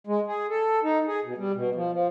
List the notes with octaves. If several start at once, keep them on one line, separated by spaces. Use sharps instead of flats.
G#3
G#4
A4
D#4
G#4
B2
G3
B2
F3
F3